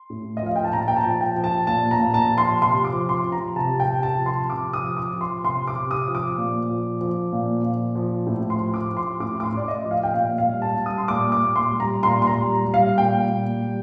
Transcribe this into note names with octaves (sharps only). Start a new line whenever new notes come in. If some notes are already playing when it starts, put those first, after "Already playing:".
Already playing: C6
A2
D#5
F3 F5
G5
A5
A#2 A#5
G5
A5
F3
G5
F3
A5
A#2 A5
A#5
A#2
A5
F3
C6
C3 C6
D6
F3
C6
F3
A#5
C3 A5
G5
C3
A5
F3
C6
C3 D6
D#6
F3
D6
F3
C6
C3 C6
D6
C3
D#6
F3
D6
A#2
F3
F3
A#2
A#2
F3
A2
C6
F3
D6
F3
C6
A2 D6
D6
C6
A2 D5
D#5
F3
F5
G5
A#2 F5
F5
G3
A5
G3
D#6
C6
A#2 D6
D6
A#2
C6
G3
A#5
A#2 C6
C6
A#5
G3
G3
F5
A#2 G5
A#2
G3